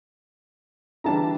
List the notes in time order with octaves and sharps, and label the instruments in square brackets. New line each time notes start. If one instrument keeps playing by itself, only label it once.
[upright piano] D3 E3 G3 [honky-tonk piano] D4 A5 A#5